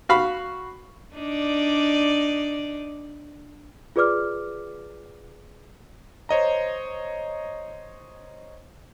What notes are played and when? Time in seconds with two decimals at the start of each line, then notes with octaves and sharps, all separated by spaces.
0.09 F#4 F5 B5
1.14 D4 D#4 D5
3.96 F4 G#4 B4 D5 D6 F6
6.29 C5 C#5 D#5 A#5